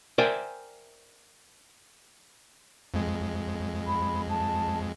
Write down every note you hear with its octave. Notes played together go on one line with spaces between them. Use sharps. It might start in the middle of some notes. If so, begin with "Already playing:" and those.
A#4 C5 D5 E5 G5 G#5
F2 G#3
B5
A5